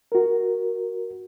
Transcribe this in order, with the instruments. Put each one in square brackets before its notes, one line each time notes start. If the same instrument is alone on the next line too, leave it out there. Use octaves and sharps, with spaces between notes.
[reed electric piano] F#4 A#4